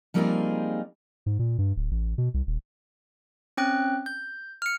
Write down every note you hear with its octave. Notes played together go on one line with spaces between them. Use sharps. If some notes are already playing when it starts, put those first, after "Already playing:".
F3 G3 A#3 C4 D#4 G#4
G#2
A#2
G2
D1
A1
B2
C2
D#1
C4 C#4 G5 F#6
G6
F6 C#7